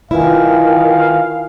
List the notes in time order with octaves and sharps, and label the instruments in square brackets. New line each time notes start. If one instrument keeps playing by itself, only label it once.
[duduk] D#3 [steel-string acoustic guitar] E4 [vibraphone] F4 B4 G#5 [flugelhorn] F5